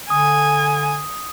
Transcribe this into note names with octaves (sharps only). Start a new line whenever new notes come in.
D3 G#5 D#6